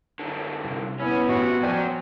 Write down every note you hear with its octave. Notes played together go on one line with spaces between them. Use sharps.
F#2 D3
C2
B3 C#4 E4
A1 C3 F#4
F3 F#3 D5 G5 G#5